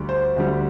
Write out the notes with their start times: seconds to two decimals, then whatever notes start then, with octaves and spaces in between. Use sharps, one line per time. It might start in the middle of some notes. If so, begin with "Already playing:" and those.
Already playing: D2 D3 G3
0.09 C5
0.36 D2 D3 G3